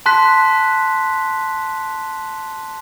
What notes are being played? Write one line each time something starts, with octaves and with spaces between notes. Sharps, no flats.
A5 C6 F#6 B6